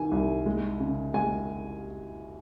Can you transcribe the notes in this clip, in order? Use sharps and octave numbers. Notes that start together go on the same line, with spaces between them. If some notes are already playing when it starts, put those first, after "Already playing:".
Already playing: D#3 G#5
C2
G#3
C#3
G#3 G#5